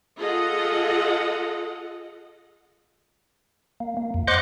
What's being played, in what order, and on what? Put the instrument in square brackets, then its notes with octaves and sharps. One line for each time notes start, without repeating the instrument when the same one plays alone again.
[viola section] F4 G#4 A4 D#5 F#5
[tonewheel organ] A#3
A#3
F2
C5 D#5 F#5 C6 D6 F#6